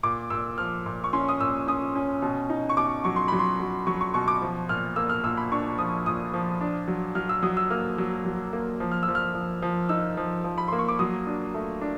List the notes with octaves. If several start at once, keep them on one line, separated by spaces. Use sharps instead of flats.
A#2 D6
A#2 E6
F3 F6
A#2
C#6
C#4 C6
D#6
A#2 E6
C#4 D#6
C#4
B2
D#4
C#6
B2 D6
F#3 C#6
C6
F#3 B5
C6
F#3
F#3 C#6
C#6
B2 C#6
D6
F3
A#2 F6
A#3 E6
F6
A#2 E6
B5
D4 C#6
F3 D#6
A#2 D#6
F3
D4
F#3
F#3 F6
E6
F#3 D#6
E6
A#3 F6
F#3
F#3
A#3
F3
F6
E6
F3
F6
F3
F3
D#4 E6
F3
F3
B5
A#3 C6
C#6
D6
F#3 D#6
D4
A3
D4